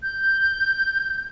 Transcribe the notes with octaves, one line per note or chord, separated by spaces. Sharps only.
G6